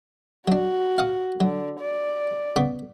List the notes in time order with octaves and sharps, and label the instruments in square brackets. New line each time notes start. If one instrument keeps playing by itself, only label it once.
[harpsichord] F#3 D4 [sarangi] F#4
[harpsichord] F5 F#5 D#6
[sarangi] D3 [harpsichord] F#3
[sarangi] D5
[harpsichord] C#3 B3 D6